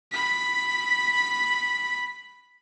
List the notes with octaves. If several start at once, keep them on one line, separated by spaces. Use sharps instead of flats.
B5 B6